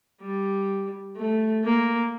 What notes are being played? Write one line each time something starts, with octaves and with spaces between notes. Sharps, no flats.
G3
A3
A#3